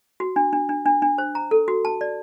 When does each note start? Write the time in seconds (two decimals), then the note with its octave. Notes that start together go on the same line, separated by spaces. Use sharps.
0.20 F#4
0.36 D4
0.53 D4
0.69 D4
0.86 D4
1.02 D4
1.18 C5
1.35 A#5
1.51 A4
1.68 F#4
1.85 A5
2.01 D5